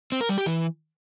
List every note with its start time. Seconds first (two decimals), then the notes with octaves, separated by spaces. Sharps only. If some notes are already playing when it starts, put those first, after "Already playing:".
0.12 C4
0.21 A#4
0.29 G3
0.38 G4
0.46 E3